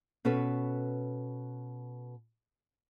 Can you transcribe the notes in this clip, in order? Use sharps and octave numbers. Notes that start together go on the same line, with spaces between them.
B2 C#4 A4 B4